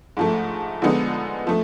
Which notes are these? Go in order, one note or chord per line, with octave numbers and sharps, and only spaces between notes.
G#2 F3 A3
D3 F3 G#3 B3 D#4
F3 A3